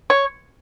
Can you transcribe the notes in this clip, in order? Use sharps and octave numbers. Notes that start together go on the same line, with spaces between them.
C#5